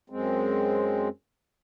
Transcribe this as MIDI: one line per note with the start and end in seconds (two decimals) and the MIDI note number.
0.10 1.09 42
0.10 1.09 56
0.10 1.09 60